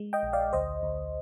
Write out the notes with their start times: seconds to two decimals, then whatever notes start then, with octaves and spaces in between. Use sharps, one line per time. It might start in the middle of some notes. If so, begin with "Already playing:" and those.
Already playing: G#3
0.13 D#5 G5
0.23 A#1
0.33 D5 F5
0.53 D2 C5 D#5
0.83 D2